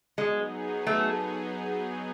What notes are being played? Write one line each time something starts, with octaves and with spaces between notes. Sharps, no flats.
F#3 G#3 B3 D#4 G#4
A3